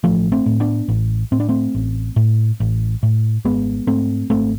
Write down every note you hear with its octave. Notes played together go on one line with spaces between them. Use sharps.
A1 F3 A3
A3 C4
A2
B3 D4
A1
A2 C4
D4
A3 C4
A1
A2
A1
A2
G#1 G#3 B3
G#2 A3 C4
G#1 A3 C4